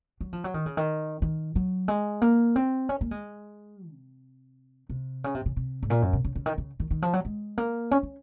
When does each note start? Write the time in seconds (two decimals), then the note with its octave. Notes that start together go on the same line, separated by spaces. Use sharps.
0.21 F#3
0.33 F3
0.44 F#3
0.54 D#3
0.66 C#3
0.77 D#3
1.22 D#3
1.55 F#3
1.88 G#3
2.22 A#3
2.56 C4
2.89 C#4
3.01 A#3
3.11 G#3
3.90 C3
4.90 C3
5.24 C#3
5.35 C3
5.46 C#3
5.57 C3
5.83 G#2
5.90 A#2
6.02 F#2
6.13 C3
6.25 C#3
6.36 C#3
6.46 D#3
6.58 C#3
6.80 D#3
6.90 D#3
7.02 F3
7.13 F#3
7.25 G#3
7.58 A#3
7.91 C#4
8.03 C#4